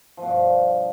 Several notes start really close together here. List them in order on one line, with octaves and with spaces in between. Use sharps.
F3 B2 G2